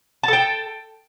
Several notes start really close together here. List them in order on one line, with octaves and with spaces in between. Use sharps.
A5 A4 G5